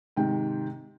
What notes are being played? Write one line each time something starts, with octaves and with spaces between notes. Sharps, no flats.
G#2 C3 D#3 G5